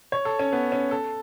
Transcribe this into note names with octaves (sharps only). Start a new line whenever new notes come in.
C#5
A4
C#4
B3
C#4
A4